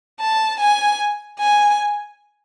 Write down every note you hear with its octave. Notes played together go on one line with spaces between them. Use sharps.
A5
G#5
G#5